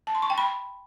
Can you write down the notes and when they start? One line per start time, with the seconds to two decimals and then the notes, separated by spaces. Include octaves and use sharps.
0.07 A5
0.15 C6
0.22 C#6
0.30 G5
0.38 B5